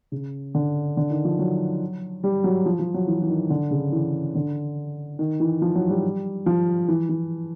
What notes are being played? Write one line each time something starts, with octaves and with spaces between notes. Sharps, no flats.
C#3
D3
D3
D#3
F3
F#3
G3
F#3
F3
F3
F#3
E3
E3
D#3
D3
C#3
E3
D3
D#3
E3
F3
F#3
G3
F3
E3
E3